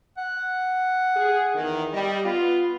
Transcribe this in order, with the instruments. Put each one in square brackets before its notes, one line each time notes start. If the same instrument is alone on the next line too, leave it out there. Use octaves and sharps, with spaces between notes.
[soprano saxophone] F#5
[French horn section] G#4
E2 D#3
[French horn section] G3 [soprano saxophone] D#5
[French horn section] B3 F4 [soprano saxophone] B4